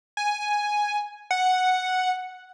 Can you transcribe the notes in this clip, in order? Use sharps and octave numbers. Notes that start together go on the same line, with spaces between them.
G#5
F#5